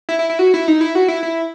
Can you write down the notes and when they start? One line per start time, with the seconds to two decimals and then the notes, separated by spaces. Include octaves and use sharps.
0.09 E4
0.19 E4
0.30 E4
0.39 F#4
0.54 E4
0.68 D#4
0.81 E4
0.95 F#4
1.08 E4
1.23 E4